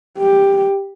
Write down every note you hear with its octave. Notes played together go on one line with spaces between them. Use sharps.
G4